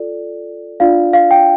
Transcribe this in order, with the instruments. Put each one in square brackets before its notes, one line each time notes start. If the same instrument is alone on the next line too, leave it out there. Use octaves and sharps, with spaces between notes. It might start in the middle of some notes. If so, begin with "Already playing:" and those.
Already playing: [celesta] F4 A4 D5
D4 F4 D5 F5
F5
G5